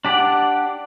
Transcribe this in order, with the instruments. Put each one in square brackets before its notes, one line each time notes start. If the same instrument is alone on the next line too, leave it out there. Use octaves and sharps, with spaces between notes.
[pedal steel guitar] D4 G4 D5 F#5